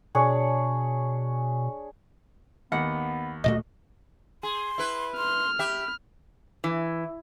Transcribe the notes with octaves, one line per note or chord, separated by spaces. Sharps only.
B2 D4 G#4 C#5
D#2 B3 F#5
D1 A#2 A3 F#4 D#5
G#4 C6
E4 B4
C6 F6
G4 E5 B5
E3